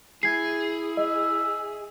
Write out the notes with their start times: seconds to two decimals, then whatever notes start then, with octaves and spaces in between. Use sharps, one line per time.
0.23 E4 G#4 G#6 C7
0.97 D#5 E5